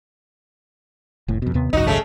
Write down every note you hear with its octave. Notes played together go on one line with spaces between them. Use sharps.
F1 A2
F2 B2
D#2 C3 B3
G#1 C#2 F#2 D#4 F#4
C#3 A3